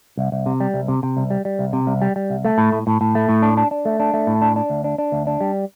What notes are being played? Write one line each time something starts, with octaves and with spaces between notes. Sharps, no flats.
C2
C2
C3
G3
C2
C3
C3
C2
G3
G3
C2
C3
C2
G3
G3
C2
A3
A2
A2
A2
A2
A3
A2
D4
D4
D4
A3
D4
A3
A2
D4
D4
D2
D4
D4
D2
D4
G3